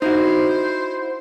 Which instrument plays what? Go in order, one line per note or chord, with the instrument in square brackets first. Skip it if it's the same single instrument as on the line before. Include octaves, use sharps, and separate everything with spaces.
[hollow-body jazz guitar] D#4 E4 F#4 [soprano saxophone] C5